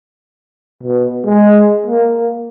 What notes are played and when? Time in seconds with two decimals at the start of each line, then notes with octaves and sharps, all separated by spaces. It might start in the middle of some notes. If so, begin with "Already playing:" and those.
0.83 B2
1.25 G#3
1.87 A#3